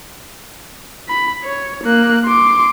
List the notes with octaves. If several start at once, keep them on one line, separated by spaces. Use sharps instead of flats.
B5
C#5
A#3 F#6
C6 D6